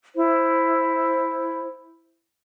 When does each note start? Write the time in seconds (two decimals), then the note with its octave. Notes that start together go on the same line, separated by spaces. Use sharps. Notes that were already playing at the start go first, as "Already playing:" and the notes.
0.16 E4 C5